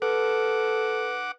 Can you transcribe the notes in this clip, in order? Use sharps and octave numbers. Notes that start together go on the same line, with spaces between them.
A4 B4 F#5 D6